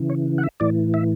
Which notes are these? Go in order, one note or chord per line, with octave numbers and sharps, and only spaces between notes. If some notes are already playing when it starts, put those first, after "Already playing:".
Already playing: C#3 E3
C#5
F#5
E5
A2 E3 D5
E5